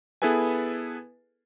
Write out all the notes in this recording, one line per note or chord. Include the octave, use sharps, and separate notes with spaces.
B3 E4 G#4 A4 B4 G#5